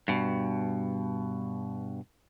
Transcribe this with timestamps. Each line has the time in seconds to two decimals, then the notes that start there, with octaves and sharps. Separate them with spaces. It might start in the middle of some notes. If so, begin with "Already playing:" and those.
0.08 G2 B2